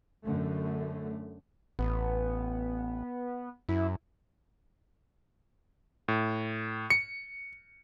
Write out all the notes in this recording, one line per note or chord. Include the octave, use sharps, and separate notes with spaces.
F#2 D3 A3
A1 B3
F#2 E4
A2
C#7